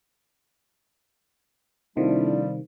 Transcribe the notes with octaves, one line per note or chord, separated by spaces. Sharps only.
C3 D#3 F3 G3 A3 D4 E4